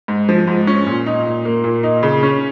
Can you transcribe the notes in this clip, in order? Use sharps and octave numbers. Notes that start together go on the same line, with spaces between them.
G#2
F3
G#2
C#4
A#2
D#4
A#2
A#3
A#2
D#4
C#3
C#4